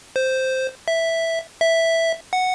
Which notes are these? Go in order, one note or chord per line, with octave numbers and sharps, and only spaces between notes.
C5
E5
E5
F#5